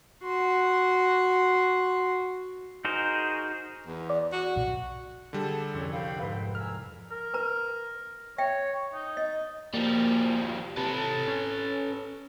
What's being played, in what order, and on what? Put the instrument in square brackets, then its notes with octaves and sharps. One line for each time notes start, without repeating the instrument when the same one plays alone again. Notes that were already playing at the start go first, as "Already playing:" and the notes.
[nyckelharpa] F#4 C6
[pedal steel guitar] D#4 F#4 G#4 A#4 C5
[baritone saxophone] E2
[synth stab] D5
[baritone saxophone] F#4
[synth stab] B1
[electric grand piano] D3 G3 [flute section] G#4 A4 A5
[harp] C2 F2 [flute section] C#4
[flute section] F5 G5 B5
[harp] G#2 G6 [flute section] B4
[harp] A#4 G#5 [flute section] E6 [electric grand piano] F6
[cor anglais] A#4
[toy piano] B4 A#5
[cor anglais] C#5 [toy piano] E5 G5
[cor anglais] D#4
[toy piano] D#5
[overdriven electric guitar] F3 G3 [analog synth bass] A#3
[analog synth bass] C3 [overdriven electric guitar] A4 B4
[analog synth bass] C#4